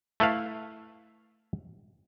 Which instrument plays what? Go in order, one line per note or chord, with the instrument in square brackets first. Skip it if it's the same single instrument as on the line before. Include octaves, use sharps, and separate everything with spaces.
[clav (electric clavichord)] A3 E4 B4 F5